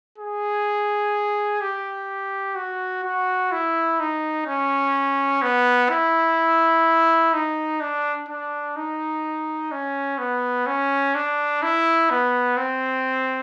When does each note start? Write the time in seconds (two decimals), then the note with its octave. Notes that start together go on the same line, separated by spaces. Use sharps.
0.18 G#4
1.61 G4
2.56 F#4
3.04 F#4
3.52 E4
4.00 D#4
4.46 C#4
5.42 B3
5.90 E4
7.33 D#4
7.80 D4
8.29 D4
8.76 D#4
9.72 C#4
10.19 B3
10.67 C#4
11.15 D4
11.62 E4
12.10 B3
12.57 C4